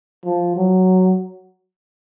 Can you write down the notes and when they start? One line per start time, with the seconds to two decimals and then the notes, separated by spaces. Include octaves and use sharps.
0.25 F3
0.56 F#3